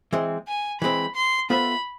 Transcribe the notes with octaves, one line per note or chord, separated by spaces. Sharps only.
E3 G#3 C4
G#5
E3 G#3 C4 B5
C6
B3 F4 A4 C5 E5 B5